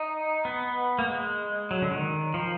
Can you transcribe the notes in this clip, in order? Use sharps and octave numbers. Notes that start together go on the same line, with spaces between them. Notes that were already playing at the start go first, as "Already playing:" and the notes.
Already playing: D#4
B3
A#3
G#3
F#3
D3
D#3
F3